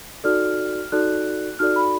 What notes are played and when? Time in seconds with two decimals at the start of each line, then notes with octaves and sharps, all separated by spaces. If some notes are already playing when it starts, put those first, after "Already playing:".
0.24 D#4 F#4 A4 D5 F6
0.92 D#4 F#4 A4 D5 F#6
1.59 D#4 F#4 A4 D5 F6
1.76 B5